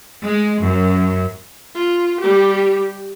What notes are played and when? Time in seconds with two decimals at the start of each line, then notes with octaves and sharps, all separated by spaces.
0.23 G#3
0.62 F#2
1.75 F4
2.20 G3 G4